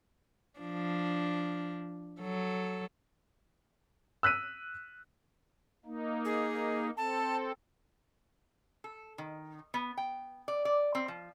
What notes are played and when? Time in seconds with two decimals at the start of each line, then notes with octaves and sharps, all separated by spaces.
0.60 F3 D4
2.21 F#3 A4
4.23 E6 F#6 B6 D#7
5.86 A#3 D#4
6.25 G#4
6.97 C4 A4 A5
8.84 A4
9.18 D#3
9.74 B3
9.97 G5
10.48 D5
10.65 D5
10.95 C4
11.08 F3